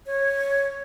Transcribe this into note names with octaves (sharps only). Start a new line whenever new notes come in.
C#5